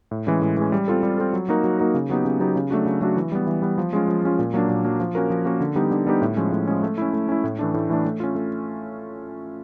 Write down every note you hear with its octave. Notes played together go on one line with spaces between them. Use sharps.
A2
E3 G#3 C#4
A2
E3 G#3 C#4
G3
C4 F4 A4
G3
C4 F4 A4
F#3
A#3 D#4 F#4 A#4
F#3
A#3 D#4 F#4 A#4
C#3
F#3 B3 D#4 G4
C#3
F#3 B3 D#4 G4
C#3
F#3 A3 D4 F#4
C#3
F#3 A3 D4 F#4
E3
G3 B3
E3
G3 B3
F3
G#3 C#4 F4
F3
G#3 C#4 F4
A#2
F#3 A#3 D4
A#2
F#3 A#3 D4
F3
A#3 C#4 F#4 A#4
F3
A#3 C#4 F#4 A#4
D3
G3 B3 D#4 G4
D3
G3 B3 D#4 G4
A2
F3 G#3 C#4
A2
F3 G#3 C#4
A3
C#4 E4
A3
C#4 E4
A2
E3 A3 D4
A2
E3 A3 D4
A3
C#4 F4
A3